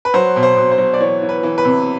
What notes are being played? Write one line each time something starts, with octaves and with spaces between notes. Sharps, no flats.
B4
F#3 C5
B2
C5
B2
C5
F#3
D5
E3 C#5
E3
B4
E3
B4
C3